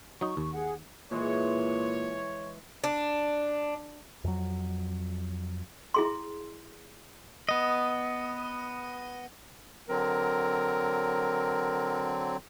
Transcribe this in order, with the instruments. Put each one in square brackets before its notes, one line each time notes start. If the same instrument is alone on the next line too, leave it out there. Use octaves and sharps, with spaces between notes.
[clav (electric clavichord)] F#3 D#4 [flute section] C#6
[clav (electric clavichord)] D#2
[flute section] G#4 F#5
[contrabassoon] A#2 [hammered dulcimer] E3 G#3 [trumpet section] C#5
[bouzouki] D4
[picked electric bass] F2 F#3
[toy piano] E4 G#4 C6
[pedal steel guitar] B3 D#5
[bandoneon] D3 F#3 C4 [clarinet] A#4